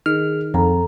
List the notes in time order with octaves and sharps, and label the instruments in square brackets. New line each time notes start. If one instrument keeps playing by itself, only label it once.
[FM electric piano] D#3 [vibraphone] G#4 [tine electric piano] F6
[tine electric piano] F2 [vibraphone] A4 A#5